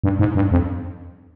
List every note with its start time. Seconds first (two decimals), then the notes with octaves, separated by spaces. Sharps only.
0.04 G2
0.19 G#2
0.35 G2
0.51 F2